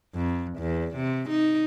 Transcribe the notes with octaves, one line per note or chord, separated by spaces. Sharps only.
F2
E2
C3
D#4